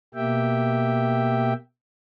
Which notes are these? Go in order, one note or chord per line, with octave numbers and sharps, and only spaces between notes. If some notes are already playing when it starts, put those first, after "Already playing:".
B2 A#3 G4 E5 G5